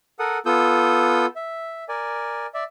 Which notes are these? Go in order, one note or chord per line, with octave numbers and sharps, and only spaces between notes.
A4 A#4 F#5 D#6
B3 F4 A4 D#6 E6 G6
E5
A#4 D5 G#5
D5 E5